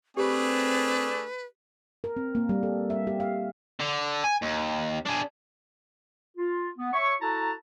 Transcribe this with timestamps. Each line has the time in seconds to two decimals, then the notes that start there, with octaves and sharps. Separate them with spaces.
0.17 A3 C4 D4 G4 G#4 B4 C5 B5
2.04 A#4
2.16 C4
2.35 A#3
2.49 G3
2.63 A4
2.90 E5
3.07 G4
3.20 F5
3.80 D3
4.24 G#5
4.42 D#2
5.06 D4 G#4
6.37 F4
6.78 B3
6.93 C#5 E5 C#6
7.21 E4 F#4 A4 A5 A#5